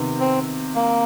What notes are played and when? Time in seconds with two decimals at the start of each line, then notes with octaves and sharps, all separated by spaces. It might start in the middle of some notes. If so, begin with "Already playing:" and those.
Already playing: C3 D#3 B3
0.20 C4
0.75 A#3